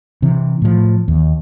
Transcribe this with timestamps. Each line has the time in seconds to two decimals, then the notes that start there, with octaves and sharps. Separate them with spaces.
0.22 C3 E3
0.62 A2 F3
1.08 D#2